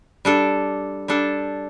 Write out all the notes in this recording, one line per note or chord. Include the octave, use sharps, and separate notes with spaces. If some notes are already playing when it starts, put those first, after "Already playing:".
G3 D4 A4
G3 D4 A4